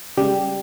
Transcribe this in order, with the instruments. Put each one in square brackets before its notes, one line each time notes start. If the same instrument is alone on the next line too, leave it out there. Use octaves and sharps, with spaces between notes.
[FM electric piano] C#3 G3 G#3 G4